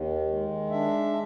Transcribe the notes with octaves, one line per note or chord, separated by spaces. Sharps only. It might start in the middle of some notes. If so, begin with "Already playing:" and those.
Already playing: D#2 D#3
G#3
D4 E5